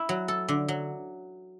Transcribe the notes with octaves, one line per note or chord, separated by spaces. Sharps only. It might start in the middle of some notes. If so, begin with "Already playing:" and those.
Already playing: E4
F#3
A4
D3
F#3